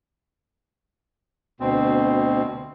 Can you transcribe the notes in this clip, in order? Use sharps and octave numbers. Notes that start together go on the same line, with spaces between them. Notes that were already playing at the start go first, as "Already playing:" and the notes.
D2 B2 C4